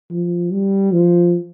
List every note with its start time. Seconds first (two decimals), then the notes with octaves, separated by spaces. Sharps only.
0.11 F3
0.52 G3
0.93 F3